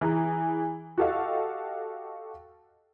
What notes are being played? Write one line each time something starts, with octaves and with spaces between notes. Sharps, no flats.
E3 G#4 A#5
F#4 G4 A4 D#5 F5 F#5